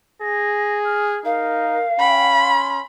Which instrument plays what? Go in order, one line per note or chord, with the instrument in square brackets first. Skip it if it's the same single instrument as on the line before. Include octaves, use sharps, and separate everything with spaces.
[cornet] G#4 [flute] A#6
[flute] F6
[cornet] D#4 [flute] A#4 [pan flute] F5
[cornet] C#4 [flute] G5 [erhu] B5
[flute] C6